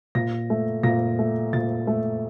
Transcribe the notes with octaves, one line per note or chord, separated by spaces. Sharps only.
A#2 A#6
A3
A#2 A#6
A3
A#2 A6
A3